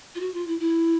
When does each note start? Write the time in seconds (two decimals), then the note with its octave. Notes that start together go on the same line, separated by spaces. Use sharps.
0.15 F4
0.20 F#4
0.34 F4
0.48 E4
0.60 E4